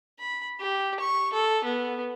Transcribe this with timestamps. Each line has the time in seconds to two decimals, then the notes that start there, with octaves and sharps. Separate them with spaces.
0.19 B5
0.59 G4
1.00 C#6
1.33 A4
1.64 B3